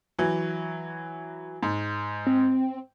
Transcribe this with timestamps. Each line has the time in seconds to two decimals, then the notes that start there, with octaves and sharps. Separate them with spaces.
0.18 E3 F#3
1.63 G#2
2.27 C4